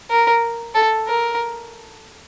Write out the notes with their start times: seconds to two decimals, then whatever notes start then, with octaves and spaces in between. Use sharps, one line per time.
0.10 A#4
0.75 A4
1.07 A#4